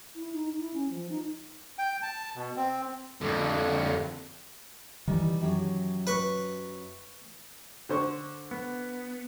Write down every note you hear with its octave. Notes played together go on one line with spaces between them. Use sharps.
E4
D#4
E4
C#4
F3
D#4
G5
A5
B2
C4
F2 D3
D#3 E3 G3 B3 D#4
F#2 F#3 G4
B4 C#6
D3 C5 C#6
B3